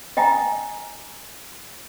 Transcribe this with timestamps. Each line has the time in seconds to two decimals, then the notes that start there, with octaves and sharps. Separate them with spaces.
0.17 D#5 G5 G#5 A#5